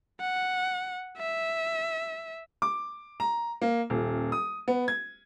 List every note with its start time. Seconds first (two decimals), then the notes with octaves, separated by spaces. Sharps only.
0.20 F#5
1.18 E5
2.62 D6
3.20 A#5
3.62 A#3
3.90 D#1
4.32 D#6
4.68 B3
4.88 G#6